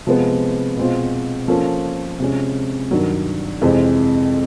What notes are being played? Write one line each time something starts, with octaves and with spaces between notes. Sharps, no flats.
C3 F3 G#3 B3
B2 G#3 C4 F4
F3 A#3 C#4 F4 A4
C3 F3 G#3 C#4
G2 D#3 F#3
F2 C3 E3 G#3 C4